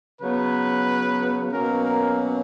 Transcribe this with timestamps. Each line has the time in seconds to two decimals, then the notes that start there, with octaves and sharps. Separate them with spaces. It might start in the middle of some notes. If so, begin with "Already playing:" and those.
0.21 C#3 F#3 B3 B4
1.52 B2 F#3 A#3 C#4 A#4
1.84 A#4